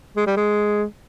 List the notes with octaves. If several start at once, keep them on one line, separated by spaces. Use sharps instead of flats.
G#3
G3
G#3